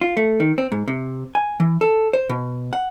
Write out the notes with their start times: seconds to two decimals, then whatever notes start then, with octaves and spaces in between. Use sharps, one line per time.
0.01 F4
0.17 A3
0.40 D#3
0.58 C4
0.72 G#2
0.88 C3
1.35 G#5
1.60 E3
1.81 A4
2.13 C5
2.29 B2
2.73 F#5